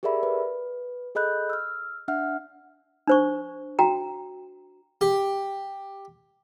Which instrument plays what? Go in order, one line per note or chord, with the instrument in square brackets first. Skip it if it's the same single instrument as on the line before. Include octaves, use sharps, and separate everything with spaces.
[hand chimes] G4 G#4 A#4 D5 E5 B5
B4
G#4 A4 D#5 B5 F#6 G6
E6 F6
D4 E5 F#5 F6
[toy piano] D4 C5 C#6
F#4 G5 A#5
[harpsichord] G4